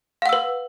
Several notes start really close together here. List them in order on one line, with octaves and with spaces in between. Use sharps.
F5 F#5 E6 B4